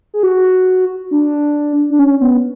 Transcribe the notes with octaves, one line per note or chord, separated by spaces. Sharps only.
G#4
F#4
D4
D4
C#4
B3